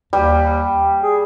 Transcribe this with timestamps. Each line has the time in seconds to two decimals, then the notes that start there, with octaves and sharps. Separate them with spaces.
0.13 D#2 G3
1.03 G#4